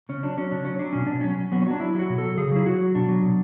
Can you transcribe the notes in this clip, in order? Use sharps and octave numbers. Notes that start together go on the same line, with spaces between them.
C#3 C#4
F#3 D4
F#3 C#4
C#3 D4
F#3 C#4
F#3 D4
B2 C#4
B2 D4
F#3 C#4
F#3
F#3 B3
C#4
F#3 D4
F#3 E4
F#3 F#4
B2
A4
F#3
C#3 G#4
F#3 E4
F#3 F#4
F#3
B2 D4
F#3
B2